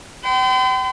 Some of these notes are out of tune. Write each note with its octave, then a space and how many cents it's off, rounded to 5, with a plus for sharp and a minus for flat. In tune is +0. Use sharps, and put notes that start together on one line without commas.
G5 -35 C6 -45